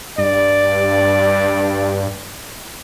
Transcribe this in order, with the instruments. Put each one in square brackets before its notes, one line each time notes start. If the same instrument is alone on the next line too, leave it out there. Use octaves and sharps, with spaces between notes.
[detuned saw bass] G2 [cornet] D5